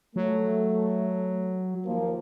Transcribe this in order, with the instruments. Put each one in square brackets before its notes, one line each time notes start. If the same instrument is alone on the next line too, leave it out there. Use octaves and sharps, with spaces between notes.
[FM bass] F#3 [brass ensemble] A3
[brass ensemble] D#2 F3 A#3